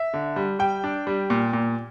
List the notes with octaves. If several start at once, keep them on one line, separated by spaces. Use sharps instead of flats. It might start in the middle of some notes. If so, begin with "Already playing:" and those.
Already playing: E5
D3
G3
G3 G5
D4
G3
A#2
A#2